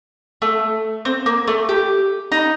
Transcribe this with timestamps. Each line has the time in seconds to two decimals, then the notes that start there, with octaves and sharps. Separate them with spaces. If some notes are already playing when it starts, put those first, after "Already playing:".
0.42 A3
1.05 C4
1.26 A#3
1.48 A3
1.69 G4
2.32 D#4